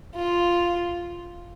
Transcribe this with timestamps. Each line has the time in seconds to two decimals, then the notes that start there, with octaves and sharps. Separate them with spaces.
0.15 F4